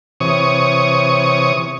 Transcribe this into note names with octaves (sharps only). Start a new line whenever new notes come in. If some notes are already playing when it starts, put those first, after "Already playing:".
C3 E3 C#5 C#6 D#6